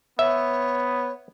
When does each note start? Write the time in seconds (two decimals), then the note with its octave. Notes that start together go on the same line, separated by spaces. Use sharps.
0.19 B3 C#5 E5